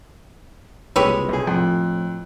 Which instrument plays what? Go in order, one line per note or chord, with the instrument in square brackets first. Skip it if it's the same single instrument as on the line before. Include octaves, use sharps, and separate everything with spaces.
[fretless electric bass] F#1 C2 A#2 [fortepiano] G#3 E6 [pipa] G4 B4 C#5
[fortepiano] B1 G#4
[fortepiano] F2 [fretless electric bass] A2 F3